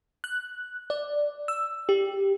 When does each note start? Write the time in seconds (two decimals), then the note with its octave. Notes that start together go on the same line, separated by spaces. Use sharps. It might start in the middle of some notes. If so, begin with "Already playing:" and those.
0.24 F#6
0.90 D5
1.48 E6
1.89 G4